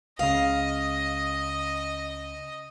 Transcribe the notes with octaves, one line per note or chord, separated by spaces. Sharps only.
C#2 C#3 D#5 F5